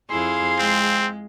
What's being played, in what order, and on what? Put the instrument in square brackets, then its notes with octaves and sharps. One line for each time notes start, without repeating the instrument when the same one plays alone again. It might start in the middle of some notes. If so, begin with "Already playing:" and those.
[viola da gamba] F2 E4 [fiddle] G#4 F5 [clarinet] C6
[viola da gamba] G#3 [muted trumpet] C4